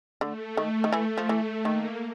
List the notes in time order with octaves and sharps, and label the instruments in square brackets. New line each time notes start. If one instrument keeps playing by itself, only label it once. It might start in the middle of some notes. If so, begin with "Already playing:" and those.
[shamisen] D3 [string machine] A3
[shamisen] D#3
D#3
E3
F3
E3
[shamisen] D#3 [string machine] A#3